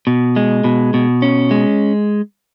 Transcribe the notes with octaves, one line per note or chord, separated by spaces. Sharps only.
B2
G#3
B2
B2
C#4
G#3